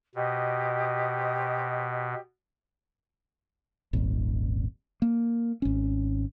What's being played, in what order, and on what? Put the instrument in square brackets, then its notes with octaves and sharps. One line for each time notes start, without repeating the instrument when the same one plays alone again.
[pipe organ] B2 [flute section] G4 C5 D#5
[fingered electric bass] D#1 G#1
A#3
G#1 C#4